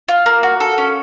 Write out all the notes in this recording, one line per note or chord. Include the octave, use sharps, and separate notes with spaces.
F4
A#3
F#4
A4
C#4